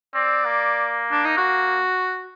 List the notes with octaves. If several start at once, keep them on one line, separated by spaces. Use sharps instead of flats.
C4 D5
A#3
D4
D#4
F#4